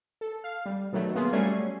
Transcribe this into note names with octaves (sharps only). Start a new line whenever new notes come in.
A4
F5
G3
B2 D#3 F#3 A3
A#3 B3 F4 G#4
F#3 G3 A3 C#4 G#5 C7